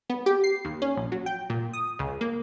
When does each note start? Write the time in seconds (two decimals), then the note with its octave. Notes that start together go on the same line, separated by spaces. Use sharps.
0.10 B3
0.26 G4
0.44 C7
0.65 D#2
0.82 C#4
0.97 A#1
1.12 F#3
1.26 G5
1.50 A#2
1.73 D#6
1.99 C#2
2.21 A#3